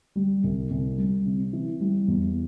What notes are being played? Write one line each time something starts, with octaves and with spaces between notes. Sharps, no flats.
G3
C2
C2
G3
C3
E3
G3
E2